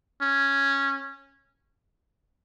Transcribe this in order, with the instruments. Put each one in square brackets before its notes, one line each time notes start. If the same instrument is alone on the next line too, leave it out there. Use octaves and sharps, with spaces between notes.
[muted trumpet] C#4